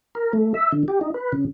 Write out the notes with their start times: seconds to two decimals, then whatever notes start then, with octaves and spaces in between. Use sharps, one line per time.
0.15 A#4
0.33 A3
0.54 E5
0.72 D3
0.88 G4
1.01 D#4
1.14 B4
1.32 C#3